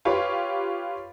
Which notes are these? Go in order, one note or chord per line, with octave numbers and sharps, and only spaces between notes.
F4 G4 B4 C#5